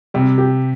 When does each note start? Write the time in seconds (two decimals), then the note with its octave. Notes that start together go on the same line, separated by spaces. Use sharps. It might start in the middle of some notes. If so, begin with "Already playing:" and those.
0.14 C3 G3
0.38 G4